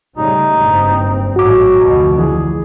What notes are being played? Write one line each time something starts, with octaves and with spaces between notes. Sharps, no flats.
C#3 G3 A3 D#4
F#1 G2 C4
A1 G#2 F#3 F#4 D6
F1 D2 B2
E3 G#4